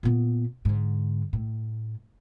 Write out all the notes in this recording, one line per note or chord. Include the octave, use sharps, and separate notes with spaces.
A#2 B3
G#2 D3
A2